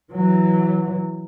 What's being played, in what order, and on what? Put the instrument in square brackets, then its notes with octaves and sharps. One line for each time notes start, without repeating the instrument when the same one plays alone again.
[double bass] E3 F#3